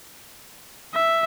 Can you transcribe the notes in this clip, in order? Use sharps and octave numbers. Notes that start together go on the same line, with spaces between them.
E5